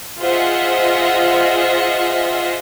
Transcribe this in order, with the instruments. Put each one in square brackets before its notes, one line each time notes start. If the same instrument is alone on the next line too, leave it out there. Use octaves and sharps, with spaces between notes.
[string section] F4 G#4 C5 D#5 E5 F#5